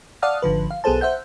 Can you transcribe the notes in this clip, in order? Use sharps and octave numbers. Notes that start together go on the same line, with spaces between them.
D5 F5 F#5 A5 D#6 F6
G#1 D3 F3 B4
F5
B1 B3 G#4 A4 C5 A5
C5 E5 F#5 G6